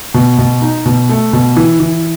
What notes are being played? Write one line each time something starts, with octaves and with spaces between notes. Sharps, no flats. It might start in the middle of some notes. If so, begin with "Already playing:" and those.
B2
B2
D#4
B2
A3
B2
E3
E3